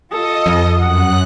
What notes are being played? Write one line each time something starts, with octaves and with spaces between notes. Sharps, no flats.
F4 A4 D#5 D#6
F2
F#2 F#5 D#6 F#6